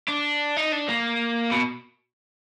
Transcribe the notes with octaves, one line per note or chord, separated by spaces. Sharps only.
D4
D#4
D4
A#3
B2